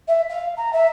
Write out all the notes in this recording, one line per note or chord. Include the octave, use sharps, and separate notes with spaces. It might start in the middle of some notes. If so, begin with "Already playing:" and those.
E5
F5
A#5
E5